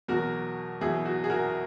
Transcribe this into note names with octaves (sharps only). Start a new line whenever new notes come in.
E2 B2 F#3 F#4 A#4
E2 B2 F#3 E4 G#4
F#4
G#4
F#4 A#4